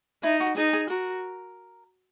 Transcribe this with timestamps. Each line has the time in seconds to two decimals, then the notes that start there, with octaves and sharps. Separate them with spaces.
0.23 D#4 E4
0.40 F#4
0.57 D#4 G#4
0.73 G#4
0.90 F#4 A#4